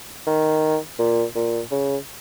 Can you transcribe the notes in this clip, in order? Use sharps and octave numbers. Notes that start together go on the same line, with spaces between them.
D#3
A#2
A#2
C#3